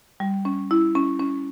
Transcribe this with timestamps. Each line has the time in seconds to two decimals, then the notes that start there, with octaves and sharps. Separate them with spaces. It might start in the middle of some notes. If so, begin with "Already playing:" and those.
0.20 G3
0.45 C#4
0.71 E4
0.95 C#4
1.19 C#4